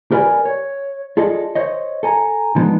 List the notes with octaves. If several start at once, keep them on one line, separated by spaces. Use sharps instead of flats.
G4 A#4 B4 D5 G5 G#5
C#5
F4 G#4 A4 D5 D#5
C5 C#5 D#5
A4 G#5 A#5
D3 F3 G#3 B3 D4 D#4